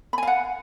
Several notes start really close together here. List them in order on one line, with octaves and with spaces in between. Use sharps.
B5 G#5 F5 F#5